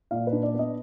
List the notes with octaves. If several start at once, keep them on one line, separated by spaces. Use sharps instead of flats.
A#2 F5
B4
D4
D5
B3 D#5